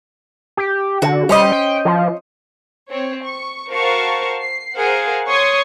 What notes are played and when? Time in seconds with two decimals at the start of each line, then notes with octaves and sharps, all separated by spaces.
0.57 G4
1.02 D3 F#4
1.29 G3 C#4 C5 D#5
1.52 G5
1.85 F3
2.90 C4 C#5
3.25 C#6
3.71 F#4 A#4 C5 F5 A5 C#6
4.39 C7
4.76 G#4 A#4 C5 F5 F#5
5.28 C#5 C6 C#6 D#6 G#6